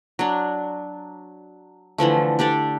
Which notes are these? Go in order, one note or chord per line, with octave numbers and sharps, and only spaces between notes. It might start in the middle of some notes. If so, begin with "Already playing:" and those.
F#3 D4
D3 E3 F3 A3
D4 G4 A4 D5